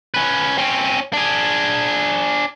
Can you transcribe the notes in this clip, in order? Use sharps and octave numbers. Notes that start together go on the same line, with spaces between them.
C#4 B4
C4 C#4
D4 G#4